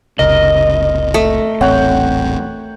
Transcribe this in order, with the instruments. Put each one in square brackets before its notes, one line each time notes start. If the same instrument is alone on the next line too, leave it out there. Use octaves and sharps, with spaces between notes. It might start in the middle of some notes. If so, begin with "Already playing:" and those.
[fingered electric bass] F#1 C#2 C3 [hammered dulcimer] A#4 [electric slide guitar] D#5
[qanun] A3
[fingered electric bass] D#1 A1 C4 [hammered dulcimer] C#5 F#5 G5